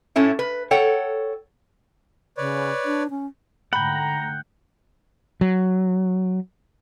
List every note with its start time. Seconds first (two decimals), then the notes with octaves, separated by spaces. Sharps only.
0.16 A2 A3 C#4 E4
0.39 B4
0.71 A4 C#5 F#5 G5
2.36 C#3 B4 C#5 D5
2.85 D4
3.10 C#4
3.73 G#2 D3 A3 F#5 G5 A#5 B5
5.41 F#3